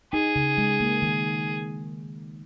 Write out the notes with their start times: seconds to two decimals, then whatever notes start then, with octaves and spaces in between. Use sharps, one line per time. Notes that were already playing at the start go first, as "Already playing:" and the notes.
0.13 D#4 G#4
0.36 C#3
0.58 G#3
0.80 A#3
1.02 D#3